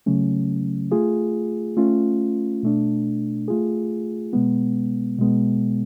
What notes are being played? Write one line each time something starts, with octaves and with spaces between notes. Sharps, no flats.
C#3 F#3 A3 C#4
A3 F4 G#4
A3 C#4 F4
B2 A3 D4
A3 F4 G#4
B2 G#3 B3
B2 G#3 B3